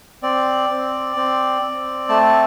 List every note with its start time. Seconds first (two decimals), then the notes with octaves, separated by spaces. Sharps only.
0.23 C4 D5
0.70 C4
1.16 C4
1.62 C4
2.09 A3 A5